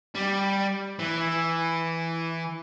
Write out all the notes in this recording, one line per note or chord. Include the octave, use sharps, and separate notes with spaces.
G3
E3